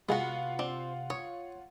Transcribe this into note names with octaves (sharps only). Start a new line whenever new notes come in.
C3 G#3 B3 F4 F#4 G#4 F5 F#5
C4 D4
C#5 D#6